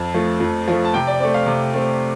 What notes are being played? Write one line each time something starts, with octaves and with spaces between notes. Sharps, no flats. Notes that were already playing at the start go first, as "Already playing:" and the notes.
Already playing: F2 A5
F3 A3
F2
F3 A3
A5
C3 G5
D5
A3 C4 D5
F5
C3
A3 C4